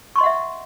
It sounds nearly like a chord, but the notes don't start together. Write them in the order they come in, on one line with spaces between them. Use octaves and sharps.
C#6 C6 D#5 F#5 E5